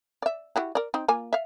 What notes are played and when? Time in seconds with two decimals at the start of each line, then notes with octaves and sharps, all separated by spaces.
0.22 D5 E5
0.56 E4 F#4 G4
0.75 A#4 D5
0.94 C4 D#4
1.08 A#3 F4 G#5
1.33 E5 F5